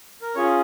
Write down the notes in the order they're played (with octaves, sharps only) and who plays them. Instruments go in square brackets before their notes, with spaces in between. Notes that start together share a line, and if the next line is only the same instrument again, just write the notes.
[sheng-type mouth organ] A#4
C#4 F4 G#4 C#5